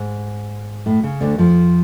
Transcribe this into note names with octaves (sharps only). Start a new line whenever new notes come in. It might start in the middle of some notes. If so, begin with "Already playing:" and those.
Already playing: G#2
A2
C#3
D2 D3
F2 F3